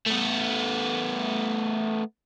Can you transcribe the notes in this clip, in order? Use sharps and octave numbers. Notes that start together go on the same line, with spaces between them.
A3 B3